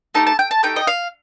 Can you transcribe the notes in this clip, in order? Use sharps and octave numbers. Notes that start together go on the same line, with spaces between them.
A3 D#4 G4 A5
A5
G5
A5
A3 D#4 G4 G5
D#5
F5